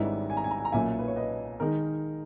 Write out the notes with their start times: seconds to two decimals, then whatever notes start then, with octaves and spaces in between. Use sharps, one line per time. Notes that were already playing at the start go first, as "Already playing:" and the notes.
Already playing: G#1 G#2 G3 C#4 E4 B4 D#5
0.30 G#5
0.37 A#5
0.44 G#5
0.51 A#5
0.58 G#5
0.65 A#5
0.72 B1 A#2 A#3 C#4 E5 G#5
0.99 B4
1.08 C#5
1.16 B4 D#5
1.60 D#3 G#3 D#4 A#4